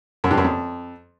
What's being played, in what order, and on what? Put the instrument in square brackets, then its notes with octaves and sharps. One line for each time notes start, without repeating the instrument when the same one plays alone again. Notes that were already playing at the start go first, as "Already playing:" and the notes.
[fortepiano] F#2
G2
F#2
F2